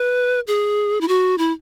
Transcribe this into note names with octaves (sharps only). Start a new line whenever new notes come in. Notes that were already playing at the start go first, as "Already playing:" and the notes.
Already playing: B4
G#4
E4
F#4
E4